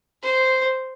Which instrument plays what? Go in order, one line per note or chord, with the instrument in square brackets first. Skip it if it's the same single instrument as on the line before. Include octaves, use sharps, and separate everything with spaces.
[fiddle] C5